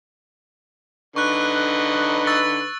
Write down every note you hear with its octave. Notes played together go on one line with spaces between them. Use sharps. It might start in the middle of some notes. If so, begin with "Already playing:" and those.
D3 D#4 B4 C#6 F#6
C#6 E6 A6